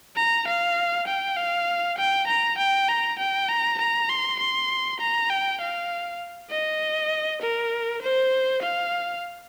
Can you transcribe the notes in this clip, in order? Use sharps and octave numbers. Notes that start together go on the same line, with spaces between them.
A#5
F5
G5
F5
G5
A#5
G5
A#5
G5
A#5
A#5
C6
C6
A#5
G5
F5
D#5
A#4
C5
F5